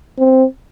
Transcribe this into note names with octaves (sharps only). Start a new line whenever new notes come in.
C4